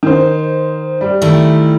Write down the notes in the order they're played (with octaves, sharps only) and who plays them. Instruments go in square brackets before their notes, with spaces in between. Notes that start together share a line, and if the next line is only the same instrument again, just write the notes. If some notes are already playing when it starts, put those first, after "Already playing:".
[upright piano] D#3 C5
G3
[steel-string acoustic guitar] D#3 A3 E4